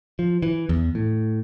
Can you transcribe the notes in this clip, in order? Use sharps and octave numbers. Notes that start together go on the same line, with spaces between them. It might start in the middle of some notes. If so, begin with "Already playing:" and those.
F3
E3
E2
A2